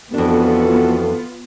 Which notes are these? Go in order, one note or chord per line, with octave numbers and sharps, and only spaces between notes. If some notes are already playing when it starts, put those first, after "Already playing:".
F2 E3 B3 D4 F4 F#4 A4